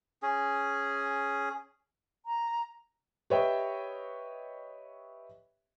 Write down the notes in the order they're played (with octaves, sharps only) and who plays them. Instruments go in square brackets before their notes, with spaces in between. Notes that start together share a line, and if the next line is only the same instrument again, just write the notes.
[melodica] C#4 G#4
[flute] A#5
[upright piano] G4 B4 C#5 D#5 E5 G5